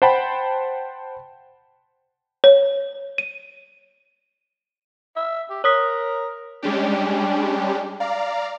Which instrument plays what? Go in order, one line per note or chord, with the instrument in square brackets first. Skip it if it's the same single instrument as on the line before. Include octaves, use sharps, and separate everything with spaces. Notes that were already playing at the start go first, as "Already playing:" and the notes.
[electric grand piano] C5 F#5 G5 A5 B5
[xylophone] C#5
D#7
[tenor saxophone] E5
G4
[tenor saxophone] A#4 [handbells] C#5 D#6 B6
[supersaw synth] G3 G#3 C#4 D4 G4
D5 F5 A#5